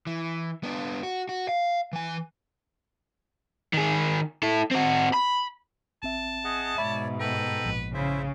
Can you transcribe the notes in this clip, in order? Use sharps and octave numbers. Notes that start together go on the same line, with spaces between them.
E3
B3 D4
F#4
F#4
F5
E3 G#5
D#3 G#4
E4 A4
C4 F#4
B5
G#1 C4 E5 A5
G#4 D#5 F#5
G#2 B2 C#5 D5 E5 B5
A4 B4 G5 A#5
A#1
C#3 E4 C5 E5